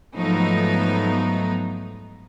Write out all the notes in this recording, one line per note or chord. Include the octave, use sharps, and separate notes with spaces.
G#2 F3 F#3 A3 B3 D#4